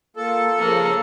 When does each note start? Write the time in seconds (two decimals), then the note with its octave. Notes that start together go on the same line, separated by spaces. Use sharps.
0.17 A#3 F4 A4
0.59 C#3 F3 A#3